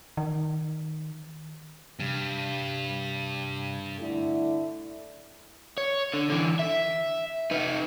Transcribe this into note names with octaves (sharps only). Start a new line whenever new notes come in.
D#3
G2 C3
D3 A3 E4
C#5
D3
D3 E3
E5
D#4 B4